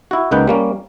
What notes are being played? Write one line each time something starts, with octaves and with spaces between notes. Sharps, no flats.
E4 F#4
C#2 A#3 D#4 B4 F#5 G5
G3 A#3 C#4